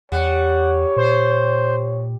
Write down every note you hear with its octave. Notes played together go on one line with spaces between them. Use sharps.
E2 G3 C#5 F#5
A#2 C5